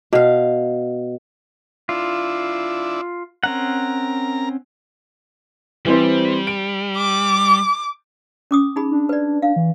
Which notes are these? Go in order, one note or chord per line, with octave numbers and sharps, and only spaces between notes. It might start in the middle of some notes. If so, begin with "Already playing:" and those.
B2 F5
D4 E4 F4
C4 C#4 A#4 F#5 A#5
E3 G3 C4 C5
D7
D6
C#4 D6 D#6
D#4 G#4 B5
D4
B4 D5
D4 F5
E3